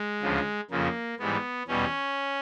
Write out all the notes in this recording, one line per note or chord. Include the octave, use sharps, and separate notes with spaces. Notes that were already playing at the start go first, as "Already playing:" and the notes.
Already playing: G#3
D2 C#3 F3
F2 C#3 F3 A#3
G#2 E3 G3 B3
E2 B2 G3 C#4